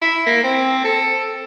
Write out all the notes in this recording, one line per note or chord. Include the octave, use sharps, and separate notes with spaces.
E4
A#3
C4
A4